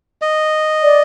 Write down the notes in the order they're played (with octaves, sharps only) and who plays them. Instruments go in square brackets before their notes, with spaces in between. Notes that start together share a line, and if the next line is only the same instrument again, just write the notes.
[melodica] D#5
[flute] D5